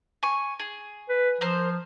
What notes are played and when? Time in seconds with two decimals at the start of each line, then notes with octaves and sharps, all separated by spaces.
0.23 G#5 C#6
0.59 G#4
1.09 B4
1.41 F3 C4 A#4 C5